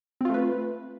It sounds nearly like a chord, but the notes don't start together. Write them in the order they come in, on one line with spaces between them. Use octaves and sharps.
C4 F4 A3 B4